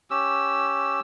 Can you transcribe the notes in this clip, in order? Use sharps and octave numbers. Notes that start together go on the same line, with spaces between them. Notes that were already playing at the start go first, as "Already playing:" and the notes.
C#4 G4 E6